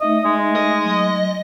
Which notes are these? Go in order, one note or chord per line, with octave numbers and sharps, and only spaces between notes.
A3 D#4 D#5 E5
G#3
D#5
F#3